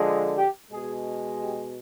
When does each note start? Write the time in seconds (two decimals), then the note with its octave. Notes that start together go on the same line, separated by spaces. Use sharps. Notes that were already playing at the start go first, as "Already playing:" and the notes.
Already playing: D3 F3 G#3
0.36 G4
0.70 B2 G#3 G#4
1.39 G4